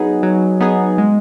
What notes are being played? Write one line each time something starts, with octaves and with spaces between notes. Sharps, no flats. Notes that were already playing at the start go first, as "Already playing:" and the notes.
Already playing: F#3 B3 D#4 G#4
F#3
B3 D#4 G#4
G#3